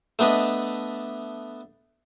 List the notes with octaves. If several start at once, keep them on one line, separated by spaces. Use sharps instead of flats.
A3 B3 D4 B4 D#5